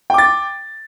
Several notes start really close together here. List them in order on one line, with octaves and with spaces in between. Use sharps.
G5 D6 A6